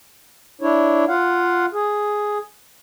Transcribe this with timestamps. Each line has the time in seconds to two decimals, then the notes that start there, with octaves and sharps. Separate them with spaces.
0.61 D4 E4 C#5
1.08 F4 F5 F#5
1.73 G#4